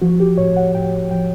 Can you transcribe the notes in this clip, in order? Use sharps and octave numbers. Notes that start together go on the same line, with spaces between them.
F3 F#4
G4
A2 C#5
F#5
A2 G5
F3 G5